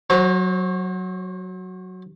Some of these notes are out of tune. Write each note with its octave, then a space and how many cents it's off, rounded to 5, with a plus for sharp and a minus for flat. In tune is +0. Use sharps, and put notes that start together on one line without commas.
F#3 +0 C5 +40 A#5 +0